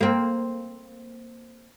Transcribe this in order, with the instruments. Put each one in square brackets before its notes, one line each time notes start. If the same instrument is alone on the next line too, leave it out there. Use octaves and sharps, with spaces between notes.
[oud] A#3 C4